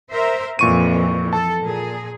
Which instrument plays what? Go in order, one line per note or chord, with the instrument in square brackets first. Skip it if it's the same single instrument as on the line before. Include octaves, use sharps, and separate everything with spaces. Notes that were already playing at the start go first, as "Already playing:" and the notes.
[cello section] A#4 C5 E5
[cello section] F2 E3 [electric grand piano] A#2 C#6 D#7
[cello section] A4 [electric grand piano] A5
[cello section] A#2 G#4